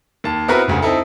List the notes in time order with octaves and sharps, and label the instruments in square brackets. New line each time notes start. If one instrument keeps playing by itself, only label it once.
[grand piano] D#2 A5
B3 C4 E4 F#4 A#4 B4
G1 D2 C#3
C4 D#4 E4 A4